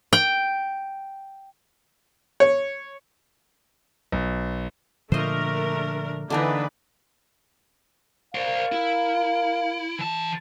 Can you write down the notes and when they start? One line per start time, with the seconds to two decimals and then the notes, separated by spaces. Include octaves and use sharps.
0.13 G5
2.40 C#5
4.12 B1
5.12 A#2 D3 F3 A3 D4 A#4 C5 D#5
6.30 D3 E3 A#3 D4 D#4 B4
8.35 A#4 C5 D5 F5
8.72 E4
9.99 E3 A5